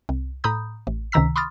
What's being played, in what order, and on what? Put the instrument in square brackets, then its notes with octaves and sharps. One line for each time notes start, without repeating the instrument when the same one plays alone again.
[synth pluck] C2
A2 A#5 B5 D#6 G6
A1
C#2 C3 D#3 A#5 E6 B6
B5 C6 D6 D#6 F6 A6